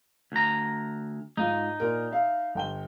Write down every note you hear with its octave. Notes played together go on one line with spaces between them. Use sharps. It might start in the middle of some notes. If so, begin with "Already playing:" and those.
D2 A#5
G#2 D#4 F4
A#2 A#4
E5 F5
G1 G5 G7